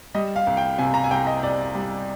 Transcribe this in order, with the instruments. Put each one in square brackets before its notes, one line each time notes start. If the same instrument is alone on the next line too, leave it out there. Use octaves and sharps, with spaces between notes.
[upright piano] G3 D#5
F5
C2
G5
C3 G#5
A#5
G#5
C2 G5
D#5
C2 D5
G3